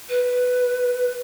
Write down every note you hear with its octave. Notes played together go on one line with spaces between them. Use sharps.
B4